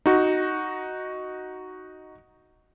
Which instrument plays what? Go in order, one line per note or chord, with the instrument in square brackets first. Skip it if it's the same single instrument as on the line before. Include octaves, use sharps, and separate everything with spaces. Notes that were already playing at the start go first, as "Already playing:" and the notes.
[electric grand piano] D#4 F#4